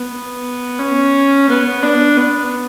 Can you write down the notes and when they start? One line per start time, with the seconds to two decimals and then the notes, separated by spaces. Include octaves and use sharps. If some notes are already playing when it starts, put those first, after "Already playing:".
Already playing: B3
0.79 C#4
1.49 B3
1.83 D4
2.18 B3